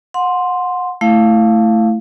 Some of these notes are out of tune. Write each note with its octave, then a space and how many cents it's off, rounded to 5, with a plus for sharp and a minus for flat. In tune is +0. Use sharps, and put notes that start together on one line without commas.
F#5 -30 C6 +0
A3 +0 E4 +10 F5 +0